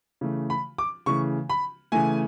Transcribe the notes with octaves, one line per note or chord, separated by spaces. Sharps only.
C#3 E3 A3
B5
D6
C#3 E3 A3 C#6
B5
C#3 E3 A3 G#5